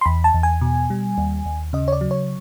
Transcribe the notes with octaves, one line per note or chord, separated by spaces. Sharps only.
C6
E2 B5
A5
E2
G#5
B2
G3
D#2
D#2
C#3 D#5
C#5
D5
F#3
C#5